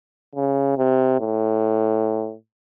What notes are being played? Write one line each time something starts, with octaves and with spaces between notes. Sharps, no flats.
C#3
C3
A2